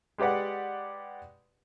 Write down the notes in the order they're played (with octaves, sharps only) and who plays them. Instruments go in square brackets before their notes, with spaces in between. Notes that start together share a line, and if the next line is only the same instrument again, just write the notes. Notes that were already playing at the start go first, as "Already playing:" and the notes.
[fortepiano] G#3 G4 B4 D5 F#5